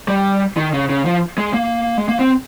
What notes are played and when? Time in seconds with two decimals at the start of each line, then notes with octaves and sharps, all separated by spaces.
0.08 G3
0.57 D#3
0.73 C#3
0.89 C#3
1.05 F3
1.38 G#3
1.54 A#3
1.97 G#3
2.09 A#3
2.19 C4